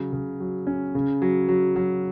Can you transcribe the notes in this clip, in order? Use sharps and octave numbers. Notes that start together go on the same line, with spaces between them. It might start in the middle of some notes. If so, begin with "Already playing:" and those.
Already playing: C#3 F#3
C#3
F#3
C#4
C#3
F#3
F#3
F#3